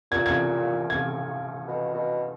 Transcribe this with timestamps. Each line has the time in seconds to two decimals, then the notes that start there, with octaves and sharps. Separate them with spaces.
0.11 A#2 G#6
0.26 G#6
0.90 G#6
1.68 B2
1.94 B2